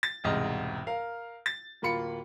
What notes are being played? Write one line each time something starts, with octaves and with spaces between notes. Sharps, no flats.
A6
E1 C2 G#2 D#5 F6
A#4 F5
A6
D1 A#3 F4 B5 C#7